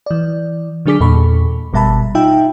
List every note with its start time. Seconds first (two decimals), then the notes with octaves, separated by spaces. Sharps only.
0.06 E3 D5
0.86 D3 F#3 D4 G#4 D6 B6
1.00 E2 A#2 A4 B5 C#6
1.73 G1 B2 G3 E5 A5 B5
2.15 D#4 F4 E5 G5